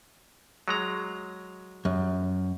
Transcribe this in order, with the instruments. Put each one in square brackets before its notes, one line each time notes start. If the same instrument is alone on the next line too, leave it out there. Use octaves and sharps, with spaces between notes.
[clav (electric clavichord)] F#3 G#3 A#5
[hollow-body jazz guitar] F#2